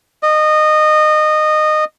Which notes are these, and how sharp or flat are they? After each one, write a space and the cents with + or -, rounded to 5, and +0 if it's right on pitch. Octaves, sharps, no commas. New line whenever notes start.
D#5 -20